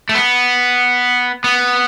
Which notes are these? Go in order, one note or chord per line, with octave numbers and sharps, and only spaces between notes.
A3
B3
B3